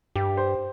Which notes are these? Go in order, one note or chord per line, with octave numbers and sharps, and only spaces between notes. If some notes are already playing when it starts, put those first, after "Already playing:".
G2 G4
C5